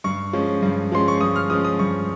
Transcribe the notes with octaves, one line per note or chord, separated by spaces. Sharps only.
G2 C#6
F3 G#3 C#4
G2
F3 G#3 C#4 C6
C#6
G2 D#6
F6
F3 G#3 C#4 D#6
D#6
G2 C#6